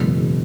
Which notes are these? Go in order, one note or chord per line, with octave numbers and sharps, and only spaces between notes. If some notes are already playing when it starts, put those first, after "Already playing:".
Already playing: F#1 E2 B2 G#3